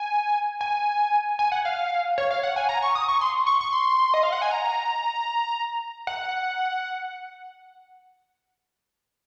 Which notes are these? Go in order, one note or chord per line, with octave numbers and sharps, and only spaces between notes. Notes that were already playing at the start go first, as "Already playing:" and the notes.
Already playing: G#5
G#5
G#5
F#5
F5
C#5
F5
F#5
G#5
A#5
C#6
D#6
C#6
C6
C#6
C#6
C6
D#5
F5
F#5
G#5
A#5
F#5